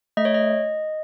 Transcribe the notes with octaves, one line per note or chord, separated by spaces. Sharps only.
A3 D#5
C#5
D#5